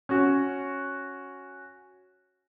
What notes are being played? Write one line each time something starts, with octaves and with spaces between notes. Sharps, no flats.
C#4 F#4